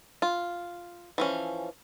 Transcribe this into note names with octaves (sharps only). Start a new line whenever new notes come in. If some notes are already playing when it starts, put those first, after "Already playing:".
F4
E3 F3 C#4